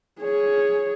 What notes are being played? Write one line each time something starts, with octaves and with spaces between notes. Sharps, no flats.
G#4 C#5